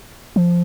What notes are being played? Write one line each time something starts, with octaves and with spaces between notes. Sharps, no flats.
F3